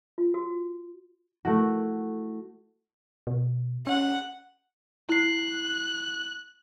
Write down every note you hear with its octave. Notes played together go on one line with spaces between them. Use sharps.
F4
F#4
A3 E4 F#4
B2
C#4 F#5
E4 F#6 C7